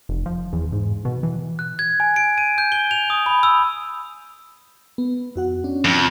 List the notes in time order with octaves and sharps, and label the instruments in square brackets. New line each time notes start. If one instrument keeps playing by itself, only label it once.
[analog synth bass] F1
F3
E2
G#2
B2
E3
[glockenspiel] F#6
G#6
G#5
D7
D#7
G6
G7
F7
D#6
B5
E6
[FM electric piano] B3
F2 F#4 F#5
C#4 D4
[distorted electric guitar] F2